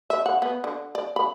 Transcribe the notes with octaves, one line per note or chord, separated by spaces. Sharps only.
E5
F#5
B3
D3
D5
B5